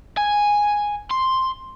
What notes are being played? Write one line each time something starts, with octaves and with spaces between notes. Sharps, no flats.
G#5
C6